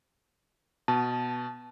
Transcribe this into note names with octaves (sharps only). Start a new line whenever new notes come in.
B2 A5